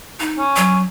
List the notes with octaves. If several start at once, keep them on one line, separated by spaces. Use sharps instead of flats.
D#4
C#4
F#3